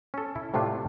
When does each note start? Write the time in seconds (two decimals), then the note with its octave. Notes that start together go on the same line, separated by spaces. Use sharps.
0.14 C#4 A4
0.36 E4
0.54 A2 C3 A3 D4 F4